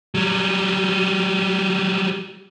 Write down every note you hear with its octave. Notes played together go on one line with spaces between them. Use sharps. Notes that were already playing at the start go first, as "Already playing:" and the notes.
F#3 G3